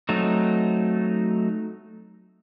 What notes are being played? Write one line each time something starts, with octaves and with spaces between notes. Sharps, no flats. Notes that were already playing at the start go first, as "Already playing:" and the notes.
F#3 A3 C4 D#4